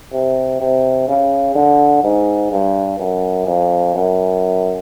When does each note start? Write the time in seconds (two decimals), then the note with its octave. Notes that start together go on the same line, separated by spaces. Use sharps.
0.13 C3
0.60 C3
1.08 C#3
1.55 D3
2.04 G#2
2.52 G2
2.99 F#2
3.47 F2
3.95 F#2